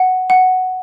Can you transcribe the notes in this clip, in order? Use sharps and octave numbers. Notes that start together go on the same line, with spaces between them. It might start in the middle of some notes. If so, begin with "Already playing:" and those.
Already playing: F#5
F#5